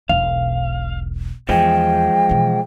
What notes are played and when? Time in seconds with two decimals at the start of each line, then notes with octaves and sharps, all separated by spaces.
0.09 E1 B1 F5
1.49 E2 F3 G#3 G5
2.29 B2 E3